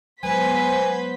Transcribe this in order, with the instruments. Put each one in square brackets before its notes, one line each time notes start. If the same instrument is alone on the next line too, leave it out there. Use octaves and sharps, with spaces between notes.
[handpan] F#3 G#3 [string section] B3 C5 B6 [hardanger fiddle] B4 [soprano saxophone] G#5